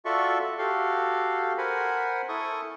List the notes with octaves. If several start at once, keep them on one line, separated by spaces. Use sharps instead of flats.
F4 F#4 A4 D5 E5 C#6
F#4 G4 A4 F5
A#4 C5 F#5 G#5 B5
E4 A4 C#6 D#6